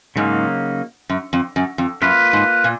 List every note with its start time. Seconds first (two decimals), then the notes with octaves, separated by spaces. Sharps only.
0.16 G#2 C#3 F#3 A#3 D#4
1.09 F#2
1.33 F2
1.56 F#2
1.78 F2
2.01 F#2 A#3 F4 B4
2.33 G#2
2.64 A#2